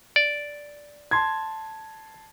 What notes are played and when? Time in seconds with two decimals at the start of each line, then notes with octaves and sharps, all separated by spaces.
0.16 D5
1.11 A5 C6 G#6